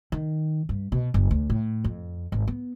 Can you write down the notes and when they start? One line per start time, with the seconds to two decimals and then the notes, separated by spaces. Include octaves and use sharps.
0.12 D#3
0.69 G2
0.92 B2
1.14 F#1
1.31 D2
1.50 A2
1.84 F2
2.32 G#1
2.48 B3